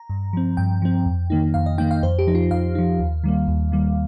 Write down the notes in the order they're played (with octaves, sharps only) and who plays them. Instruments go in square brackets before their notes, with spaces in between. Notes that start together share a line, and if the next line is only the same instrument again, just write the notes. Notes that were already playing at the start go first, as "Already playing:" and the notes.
Already playing: [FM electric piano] A#5
G2
F3 C4
G2 G5
F3 C4
F2
D#3 A#3 D#4
F2 F5
D#5
D#3 A#3 D#4 G5
F5
F2 C5
G4
F3 D#4
F4
F2 F5
F3 D#4
D#2
D#3 G3 A#3
D#2
D#3 G3 A#3